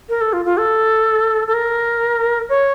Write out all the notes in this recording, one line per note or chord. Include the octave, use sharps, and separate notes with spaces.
A#4
A4
F4
F4
A4
A4
A#4
C#5